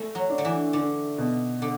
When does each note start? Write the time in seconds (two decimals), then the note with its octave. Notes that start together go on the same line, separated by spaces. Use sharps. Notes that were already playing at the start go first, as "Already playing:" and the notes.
Already playing: A3
0.15 F#3
0.29 D4
0.38 D3
0.45 E3
0.73 D3 D4
1.18 B2
1.62 D3